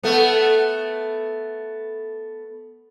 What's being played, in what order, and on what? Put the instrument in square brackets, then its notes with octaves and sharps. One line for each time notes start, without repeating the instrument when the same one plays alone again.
[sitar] A3 B3